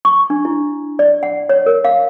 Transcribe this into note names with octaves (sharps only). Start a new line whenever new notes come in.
C#6
D4
E4
D5
F#5
C#5
A#4
F5